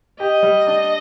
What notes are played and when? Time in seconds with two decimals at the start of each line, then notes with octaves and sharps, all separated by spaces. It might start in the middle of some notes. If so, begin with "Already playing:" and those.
0.20 G4 D#5
0.43 G3
0.67 D4